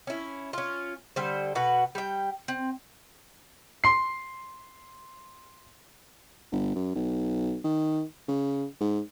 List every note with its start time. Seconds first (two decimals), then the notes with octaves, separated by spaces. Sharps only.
0.07 C#4 E4
0.53 C#4 F4
1.16 D3 G3 C5
1.55 B2 F#4 B4
1.95 G3 G5
2.48 C4
3.84 C6 C7
6.52 G1
6.75 F#2
6.95 B1
7.64 D#3
8.28 C#3
8.81 G#2